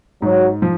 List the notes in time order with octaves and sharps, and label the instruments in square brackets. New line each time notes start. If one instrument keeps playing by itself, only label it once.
[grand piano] G#2 [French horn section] F#3
[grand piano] F3